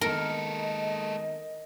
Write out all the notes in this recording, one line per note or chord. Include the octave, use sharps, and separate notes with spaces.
D#3 G#3 A3 B3 A4 A#4 D#5